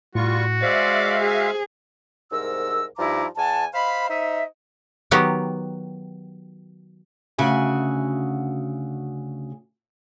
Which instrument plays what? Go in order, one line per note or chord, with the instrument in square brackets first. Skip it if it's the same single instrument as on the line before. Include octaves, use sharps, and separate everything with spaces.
[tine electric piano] A2 [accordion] G3 F4 C#6 [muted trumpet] F#4
[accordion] G#3 E5 F5 [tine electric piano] C5 [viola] D5
[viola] G#4
[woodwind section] C2 G#2 A#4 E6
G2 F3 D#4 E4 A#5 D6
E2 F#5 G#5 A5
C5 D#5 F5 B5
D#4 C5 D#5 E5
[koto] D#3 F#3 B3 G4 A#5
[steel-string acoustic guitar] D2 C#3 F#4 E5 G#5